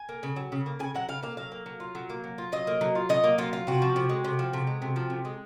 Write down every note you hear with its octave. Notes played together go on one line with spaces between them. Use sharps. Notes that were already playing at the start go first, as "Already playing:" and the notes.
Already playing: G#5
A#3
C#3
F#3
C#3
A#3
C#3 G#5
F#3 F#5
C#3 F5
A#3 F5
F#3 F5
A#3
F#3
F4
F#3
A#3
F#3
F4
F#3 D#5
A#3
F#3
F4
F#3 D#5
A#3
F#3 F4
F4
C3 F#4
F3
C3
G#3
C3
F3
C3
G#3
C3
F3
C3
G#3